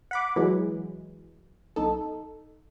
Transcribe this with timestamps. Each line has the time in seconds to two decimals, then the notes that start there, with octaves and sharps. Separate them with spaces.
0.11 F#5 B5 D6
0.36 E3 F#3 G#3
1.76 B1 D#4 A4